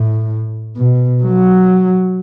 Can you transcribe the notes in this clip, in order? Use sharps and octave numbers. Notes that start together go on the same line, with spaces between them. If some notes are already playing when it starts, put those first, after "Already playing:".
Already playing: A2
B2
F#3